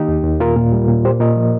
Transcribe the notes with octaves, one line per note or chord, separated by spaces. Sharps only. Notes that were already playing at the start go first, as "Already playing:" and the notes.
Already playing: D#3 A#3 D#4 G4
D#2
D#2
A#2 F4 A#4
A#2
G3
A#2
A#3 G4 C5
A#2 A#4 D#5
F3